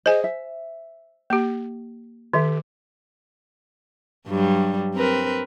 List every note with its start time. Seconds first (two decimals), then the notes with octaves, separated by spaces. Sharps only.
0.06 G#4 C5 D#5 G#5
0.24 E5
1.30 A#3 G4
2.34 D#3 G4 A4 E5
4.27 G2 F#3 G3
4.95 C4 A#4 B4